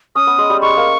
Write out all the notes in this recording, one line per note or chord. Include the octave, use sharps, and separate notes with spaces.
C#4 D#6
B3
G#3
G3
G#3 C#6
A#3